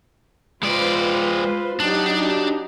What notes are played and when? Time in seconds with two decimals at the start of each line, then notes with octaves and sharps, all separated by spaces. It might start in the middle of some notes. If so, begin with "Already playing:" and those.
0.63 G#3 F4 B4 C5 D5
1.80 F#3 D4 D#4 G4